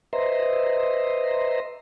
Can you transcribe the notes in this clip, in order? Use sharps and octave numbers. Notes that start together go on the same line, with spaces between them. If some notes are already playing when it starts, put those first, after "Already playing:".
B4 C5 D#5 E5 A#5 C6